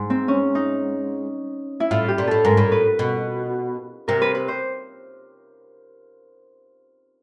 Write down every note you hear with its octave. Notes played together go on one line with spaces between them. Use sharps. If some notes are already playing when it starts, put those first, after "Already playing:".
Already playing: G#2
C4
C#4
D#4
E4
A2 F4
G4
A#2
A2 A4
G#2 A#4
A2
B4
B2
C3 A#4
B4
B4
C5